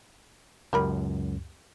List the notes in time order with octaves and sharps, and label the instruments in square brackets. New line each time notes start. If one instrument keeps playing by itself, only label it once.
[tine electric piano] C#2 F#2 [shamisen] G4 A#4 B5